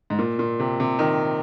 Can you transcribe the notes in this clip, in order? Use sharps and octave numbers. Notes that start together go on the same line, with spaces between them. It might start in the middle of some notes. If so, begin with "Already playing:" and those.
G#2
A#2
A#2
C3
C3
D#3